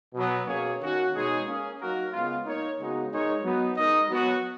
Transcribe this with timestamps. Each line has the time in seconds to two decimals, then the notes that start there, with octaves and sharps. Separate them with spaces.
0.14 B2 F#3 B3
0.47 B2 A#3 C#4 G#4 C#5
0.80 D#3 A#3 C#4 F#4
1.13 B2 G#3 D#4 G#4 C#5
1.46 A#3 C#4 G#4
1.79 F#3 A#3 D#4 F#4 A#4
2.12 C#3 G#3 B3 F4
2.45 A#3 D#4 A#4 C#5
2.78 C#3 G#3 B3 D#4 F#4
3.10 G#3 D#4 A#4 C#5
3.43 F#3 B3 D#4
3.76 G#3 D#4 A#4 D#5
4.09 F#3 B3 F#4